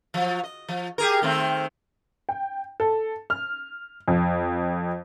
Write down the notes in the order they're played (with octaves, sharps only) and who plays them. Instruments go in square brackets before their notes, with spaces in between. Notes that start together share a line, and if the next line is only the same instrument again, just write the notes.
[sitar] F3 F#3
D#5
F3
G4 G#4 A#4
D#3 A3 C4
[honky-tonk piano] G5
A4
F6
F2